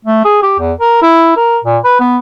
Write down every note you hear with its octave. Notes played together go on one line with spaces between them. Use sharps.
A3
G#4
G4
E2
A#4
E4
A#4
A#2
B4
B3